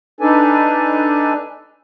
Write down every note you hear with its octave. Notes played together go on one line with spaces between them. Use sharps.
D4 D#4 A4 B4 D5 G#5